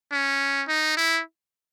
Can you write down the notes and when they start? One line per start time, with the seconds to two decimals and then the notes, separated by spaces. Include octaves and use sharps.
0.12 C#4
0.68 D#4
0.97 E4